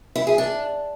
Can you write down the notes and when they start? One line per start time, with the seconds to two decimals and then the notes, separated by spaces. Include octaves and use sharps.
0.16 E4
0.27 G#4
0.38 D4